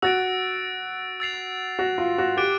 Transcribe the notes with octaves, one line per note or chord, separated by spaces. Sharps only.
F#4 E6 A6 D7
E6 A6 C7 F7
F#4
F4
F#4
G4 D6 F#6 A6 D7